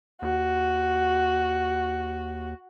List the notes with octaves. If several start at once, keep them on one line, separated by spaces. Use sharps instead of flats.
D#2 F#4